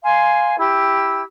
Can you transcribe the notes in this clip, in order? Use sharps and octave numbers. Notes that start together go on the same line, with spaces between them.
F5 G#5 C6
E4 G4 E6